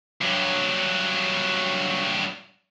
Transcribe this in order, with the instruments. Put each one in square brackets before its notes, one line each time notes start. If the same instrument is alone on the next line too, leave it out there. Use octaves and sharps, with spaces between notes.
[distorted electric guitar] G2 F#3